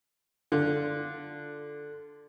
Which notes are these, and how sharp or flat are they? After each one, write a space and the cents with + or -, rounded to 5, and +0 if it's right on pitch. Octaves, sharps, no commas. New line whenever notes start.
D3 +0 F4 -10